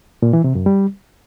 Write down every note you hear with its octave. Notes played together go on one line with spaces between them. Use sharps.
A#2
E3
C3
F#2
G3